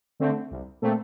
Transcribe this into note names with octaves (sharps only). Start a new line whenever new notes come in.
D3 A3 C4
C2
A#2 A3 C4